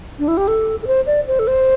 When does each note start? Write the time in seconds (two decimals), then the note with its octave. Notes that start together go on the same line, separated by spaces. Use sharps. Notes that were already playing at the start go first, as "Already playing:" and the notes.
0.19 D4
0.28 E4
0.37 G4
0.48 A4
0.83 A4
0.87 C5
1.06 D5
1.27 C5
1.39 A4
1.47 C5